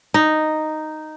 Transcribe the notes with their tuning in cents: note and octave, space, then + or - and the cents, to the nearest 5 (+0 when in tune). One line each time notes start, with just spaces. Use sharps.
D#4 -5